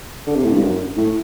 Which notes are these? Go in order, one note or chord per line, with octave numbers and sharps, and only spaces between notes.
D3
C3
A2
G2
F#2
A2